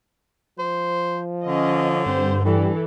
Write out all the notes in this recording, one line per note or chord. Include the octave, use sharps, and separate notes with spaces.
F3 C5
D3 C#4 D#5
G2 C4 C5
A2 E3 G3 A4